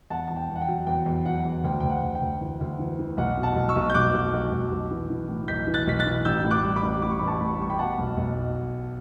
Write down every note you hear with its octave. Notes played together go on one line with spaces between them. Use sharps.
E2 F#5 A5
E2 A5
G5
E2
F#5
G5
F#3
E2 G5
E2
F#3 F#5
E2
D2 G5
D2 G5
F#5
D2
G5
D2
E3
D2
E3
E3
B1 F#5
B2
F#5 A5
B1
C#6 E6
B1
G6
B1 D6 F#6
B1
B1
B1
B1
E3
E3
A2
B1 G6 B6
E3
F#6 A6
B1 B6
F#6 A6
E3
A1 E6 G6
A2
D6 F#6
G3
B5 D6
A1
A2 D6
C#6
A1 B5
A5 C#6
A2 B5
C#6
B5
G3 C#6
G5 B5
B2 F#5 A5
B1
B1